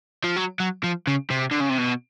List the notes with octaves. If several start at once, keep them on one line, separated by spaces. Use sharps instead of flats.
F3
F#3
F#3
F3
C#3
C3
D3
C#3
C3
B2